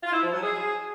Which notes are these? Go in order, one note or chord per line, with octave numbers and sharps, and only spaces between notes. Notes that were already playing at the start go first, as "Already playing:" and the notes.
F4
E4
F3
F#3
G#4